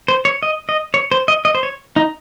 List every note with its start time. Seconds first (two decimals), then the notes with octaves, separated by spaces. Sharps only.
0.08 C5
0.25 C#5
0.43 D#5
0.69 D#5
0.94 C#5
1.12 C5
1.28 D#5
1.45 D#5
1.55 C5
1.63 C#5
1.96 D#4